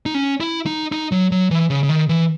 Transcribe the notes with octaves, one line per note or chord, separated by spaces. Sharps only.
D#4
C#4
E4
D#4
D#4
F#3
F#3
E3
C#3
C#3
D#3
E3